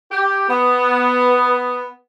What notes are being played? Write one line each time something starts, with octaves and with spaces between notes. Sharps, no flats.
G4
B3